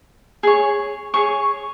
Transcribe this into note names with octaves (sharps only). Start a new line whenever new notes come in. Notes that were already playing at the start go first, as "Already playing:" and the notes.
G#4 C#5
G#4 C#5 C#6